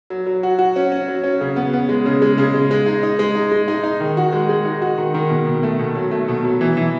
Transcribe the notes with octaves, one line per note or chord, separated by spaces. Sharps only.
F#3
F#3
F#4
F#4
C#4
C#4
F#3
C#4
C#3
B3
B3
G#3
C#3
G#3
C#3
G#3
G#3
D#4
D#4
G#3
D#4
G#3
D#4
D#4
D#3
F#4
G#3
G#3
D#4
F#4
D#3
D#3
B2
B2
A3
B2
F#3
A3
B2
F#3
E3
E3